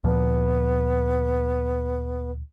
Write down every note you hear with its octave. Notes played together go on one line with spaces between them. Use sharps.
D2 A#2 F3 B3